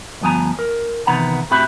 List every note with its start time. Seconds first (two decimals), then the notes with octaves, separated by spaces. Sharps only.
0.21 D2 G2 F3 B3 G#5 A#5
0.59 A#4
1.07 C3 D#3 E3 B3 F#5 A#5
1.51 A2 C4 F#4 G4 E5 B5